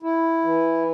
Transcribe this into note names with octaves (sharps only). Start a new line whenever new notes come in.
E4
E3